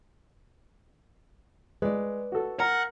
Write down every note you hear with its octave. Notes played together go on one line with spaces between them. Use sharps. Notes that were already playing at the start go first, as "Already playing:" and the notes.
G#3 B4 D5
F#4 A4
A#4 F#5 A#5